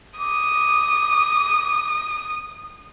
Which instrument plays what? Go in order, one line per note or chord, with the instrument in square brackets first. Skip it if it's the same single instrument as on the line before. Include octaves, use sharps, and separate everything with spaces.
[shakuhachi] D6 [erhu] D#6